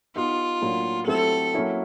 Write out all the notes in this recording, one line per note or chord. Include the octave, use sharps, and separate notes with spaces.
B3 D#4 F4 G4
A2 F#3 A#3 D4
F#3 A3 C4 E4 G4 A4
F#3 A#3 C#4 E4